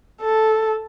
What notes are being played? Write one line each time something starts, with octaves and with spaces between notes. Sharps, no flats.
A4